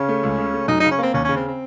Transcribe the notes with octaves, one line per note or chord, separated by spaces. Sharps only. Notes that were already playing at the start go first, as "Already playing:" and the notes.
Already playing: C#3 C#4
A3
C#2
C#3
A3
F#2 D#4
C#3 D#4
C#4
A#3 C4
D#2 C#4
C#3 C#4
C4
C4